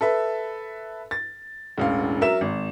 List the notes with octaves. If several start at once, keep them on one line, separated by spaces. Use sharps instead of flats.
A4 B4 E5
A6
E1 A1 F5
F#3 A#4 E5 E7
G#1